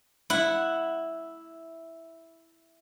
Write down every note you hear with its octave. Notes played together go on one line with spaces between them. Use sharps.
E4 F#5